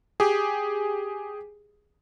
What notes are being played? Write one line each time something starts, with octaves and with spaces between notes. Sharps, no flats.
G4 G#4